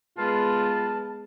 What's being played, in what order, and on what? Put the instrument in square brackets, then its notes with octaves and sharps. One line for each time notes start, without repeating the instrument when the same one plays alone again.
[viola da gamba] G#3 B3 B4 [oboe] F4 [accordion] A5